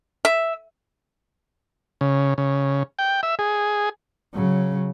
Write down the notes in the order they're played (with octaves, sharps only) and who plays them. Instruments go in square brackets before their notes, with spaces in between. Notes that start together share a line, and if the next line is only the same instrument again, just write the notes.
[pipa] E5
[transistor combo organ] C#3
C#3
G5
E5
G#4
[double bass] C#3 F#3